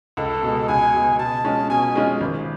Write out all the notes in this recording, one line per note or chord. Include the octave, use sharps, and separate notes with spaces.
C#2 A4
B2 G#3
C#2 G#5
B2 G#3
B2 A5
G#3 C#4 F4
B2 G#5
G#3 C#4 F4
G#1